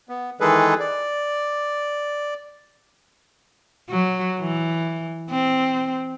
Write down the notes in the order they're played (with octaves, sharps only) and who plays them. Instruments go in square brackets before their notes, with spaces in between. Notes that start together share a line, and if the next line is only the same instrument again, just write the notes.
[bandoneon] B3
D#3 E3 G#3 G#4 A4 B4
D5
[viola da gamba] F#3
E3
C4